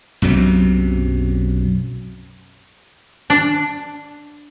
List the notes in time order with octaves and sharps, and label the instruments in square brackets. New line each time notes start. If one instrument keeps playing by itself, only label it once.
[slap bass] B1 F#2 C3 F#3
[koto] D4